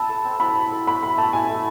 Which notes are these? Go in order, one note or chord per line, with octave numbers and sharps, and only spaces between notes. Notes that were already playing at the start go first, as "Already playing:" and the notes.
Already playing: B4 E5 A5
A4
C4
E4 B5
E5
A4
A3 B5
A4 B5
A3 A5
E4 G#5
A3